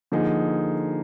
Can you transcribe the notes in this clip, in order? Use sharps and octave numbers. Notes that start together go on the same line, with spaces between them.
D3 F3 A#3 D#4 G#4